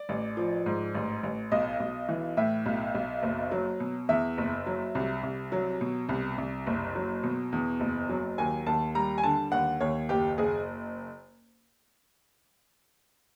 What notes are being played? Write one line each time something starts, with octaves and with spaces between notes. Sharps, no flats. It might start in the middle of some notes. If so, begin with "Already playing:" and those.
Already playing: D5
A1
F3
G#2
A1
A1
B1 D#5
B1
E3
A2 E5
B1
B1
F#1
F#3
B2
E2 E5
F#1
F#3
C2
C2
F#3
B2
C2
C2
F#1
F#3
B2
E2
F#1
F#3
D#2 G#5
D#2 A5
G3 A#5
G#5
D3 A5
D#2 F#5
D#2 C#5
F#1 G4
F#1 G#4